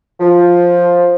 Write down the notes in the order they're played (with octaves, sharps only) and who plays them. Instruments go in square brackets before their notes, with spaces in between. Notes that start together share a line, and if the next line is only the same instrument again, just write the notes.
[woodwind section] F3